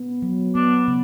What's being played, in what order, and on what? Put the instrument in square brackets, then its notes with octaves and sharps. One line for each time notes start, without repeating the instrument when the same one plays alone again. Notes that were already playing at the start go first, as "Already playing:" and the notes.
Already playing: [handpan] B3
F#3
[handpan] B3 [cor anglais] D4
[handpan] C#3